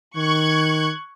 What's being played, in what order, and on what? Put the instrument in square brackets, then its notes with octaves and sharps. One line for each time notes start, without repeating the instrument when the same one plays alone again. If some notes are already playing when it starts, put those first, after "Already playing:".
[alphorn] D#3 [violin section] C#6 F#6 G#6